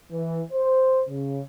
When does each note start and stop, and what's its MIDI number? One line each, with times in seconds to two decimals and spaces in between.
0.12 0.41 52
0.52 1.02 72
1.09 1.41 49